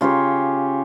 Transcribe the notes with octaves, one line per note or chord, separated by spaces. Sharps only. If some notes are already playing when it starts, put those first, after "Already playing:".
C#3 F4 G4 C#5